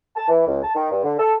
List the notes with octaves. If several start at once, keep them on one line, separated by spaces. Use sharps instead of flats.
A5
E3
C#2
A5
D#3
G2
D3
A4